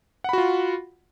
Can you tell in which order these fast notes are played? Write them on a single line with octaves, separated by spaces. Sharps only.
F#5 B5 F#4 F4